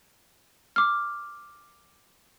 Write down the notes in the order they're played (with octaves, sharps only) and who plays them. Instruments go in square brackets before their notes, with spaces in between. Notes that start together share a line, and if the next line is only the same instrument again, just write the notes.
[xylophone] D6 F6